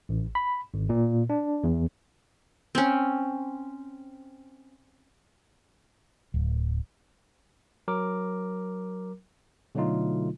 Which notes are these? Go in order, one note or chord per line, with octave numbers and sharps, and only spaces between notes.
A1
B5
G#1
A#2
D4
E2
C4 C#4
D1
F#3 A#4 D6
B2 D3 F#3 A3 D#4 F4